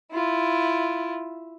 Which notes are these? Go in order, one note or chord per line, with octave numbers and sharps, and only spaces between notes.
E4 F4